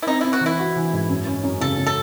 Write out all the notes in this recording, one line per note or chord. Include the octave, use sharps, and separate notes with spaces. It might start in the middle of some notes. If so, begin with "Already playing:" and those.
E4
C4 D#4
C4 E4
F#4
E3 E4
F#4
E3
G#2
F#2
C#4
F#2
C#3 A4
C#3
A4